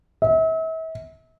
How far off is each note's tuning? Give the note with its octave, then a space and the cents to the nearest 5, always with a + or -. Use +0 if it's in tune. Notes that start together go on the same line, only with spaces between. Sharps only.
E5 -40